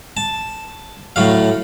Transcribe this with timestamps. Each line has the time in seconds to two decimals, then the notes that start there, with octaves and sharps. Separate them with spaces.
0.17 A5
1.16 A2 F#3 F5